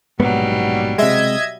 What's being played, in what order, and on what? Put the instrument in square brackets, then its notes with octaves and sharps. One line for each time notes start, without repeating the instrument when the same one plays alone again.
[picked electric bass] A#1 G#2 B3 [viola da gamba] B2 F#3 G3
[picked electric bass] C3 G#3 [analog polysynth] D#5 E5 G#6